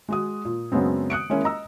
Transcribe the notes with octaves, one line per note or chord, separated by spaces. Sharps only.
G#3 F#4 D#6
A#2
F#2 C#3 G#3 B3 C4
D#6 F#6 C#7 D7
G#3 A#3 C#4 E4
D#5 A#5 E6